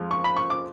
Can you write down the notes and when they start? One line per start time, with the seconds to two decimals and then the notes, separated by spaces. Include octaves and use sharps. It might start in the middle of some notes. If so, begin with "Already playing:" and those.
Already playing: F2 F3 G#3
0.11 C#6
0.24 B5
0.36 C#6
0.50 D6